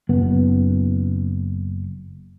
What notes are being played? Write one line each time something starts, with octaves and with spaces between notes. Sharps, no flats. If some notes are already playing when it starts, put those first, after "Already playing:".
F#1 B3